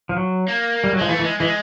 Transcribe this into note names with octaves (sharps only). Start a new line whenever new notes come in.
F3
F#3
A#3
G3
F#3
F3 G#3
E3 A3
E3
G#3
E3 G#3